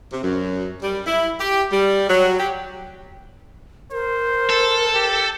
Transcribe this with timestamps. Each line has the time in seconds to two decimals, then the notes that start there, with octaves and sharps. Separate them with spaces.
0.12 C3
0.23 F#2
0.82 G3
1.06 E4
1.40 G4
1.72 G3
2.09 F#3
2.39 G4
3.92 A#4 C5
4.50 A4
4.95 G4